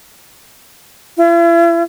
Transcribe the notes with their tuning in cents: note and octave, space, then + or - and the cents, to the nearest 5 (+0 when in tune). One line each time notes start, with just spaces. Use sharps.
E4 +45